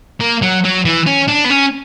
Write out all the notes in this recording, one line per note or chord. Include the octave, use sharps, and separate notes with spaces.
A#3
F#3
F#3
E3
C#4
D4
B3
C#4